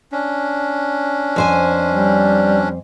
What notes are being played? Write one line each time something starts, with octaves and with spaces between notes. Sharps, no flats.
C#4 D4
F2 C5 G#5
G3